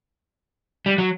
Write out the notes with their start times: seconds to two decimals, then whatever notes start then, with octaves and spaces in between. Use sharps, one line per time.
0.86 G3
0.98 F#3